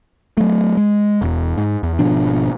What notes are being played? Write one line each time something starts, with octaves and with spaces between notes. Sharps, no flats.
F#3 A3
G#3
E1 E2
G#2
E2
G#1 B2 F3 D4